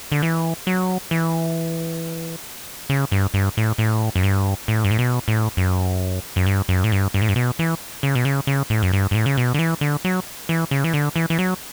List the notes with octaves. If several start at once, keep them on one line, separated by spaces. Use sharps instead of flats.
D3
E3
F#3
E3
C#3
G2
G2
A2
A2
F#2
G2
A2
G2
A2
B2
A2
F#2
F#2
G2
F#2
A2
G2
G2
A2
G2
B2
E3
C#3
B2
C#3
C#3
A2
F#2
G2
G2
A2
C#3
B2
D3
E3
D3
F#3
E3
C#3
E3
D3
E3
E3
F#3